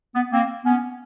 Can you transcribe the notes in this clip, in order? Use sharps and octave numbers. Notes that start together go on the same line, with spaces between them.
B3
A#3 C4
B3 C#4